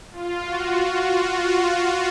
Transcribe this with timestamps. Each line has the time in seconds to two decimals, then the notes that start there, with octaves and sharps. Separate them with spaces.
0.12 F4
0.44 F#4
0.76 F#4
1.07 F#4
1.38 F4